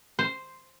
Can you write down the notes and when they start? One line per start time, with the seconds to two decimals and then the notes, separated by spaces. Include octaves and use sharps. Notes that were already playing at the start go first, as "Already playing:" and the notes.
0.19 C5